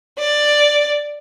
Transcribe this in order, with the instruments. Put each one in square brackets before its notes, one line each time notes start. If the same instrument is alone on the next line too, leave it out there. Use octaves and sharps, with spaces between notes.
[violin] D5